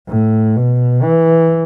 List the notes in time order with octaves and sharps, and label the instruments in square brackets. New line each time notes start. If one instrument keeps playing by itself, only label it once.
[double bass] A2
B2
E3